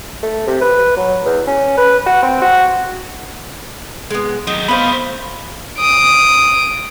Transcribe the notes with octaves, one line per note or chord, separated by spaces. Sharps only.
A3
C3
B4
F#3
E2
C#4
B4
F#4
C4
F#4
G#3 B3
D#3 F#3 D#4
A3 B3 C5 D#5 F5 B5
D#6 D7